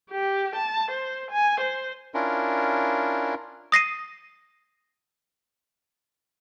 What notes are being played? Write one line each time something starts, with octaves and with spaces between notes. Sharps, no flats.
G4
A5
C5
G#5
C5
C#4 D4 E4 F4 A#4
D#6 A#6 C7 D#7